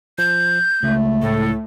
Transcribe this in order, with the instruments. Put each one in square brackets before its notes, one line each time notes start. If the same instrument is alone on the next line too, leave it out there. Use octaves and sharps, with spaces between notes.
[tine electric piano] F3 [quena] G6
[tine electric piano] C#2 [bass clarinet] A3
[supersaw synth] A2 [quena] A4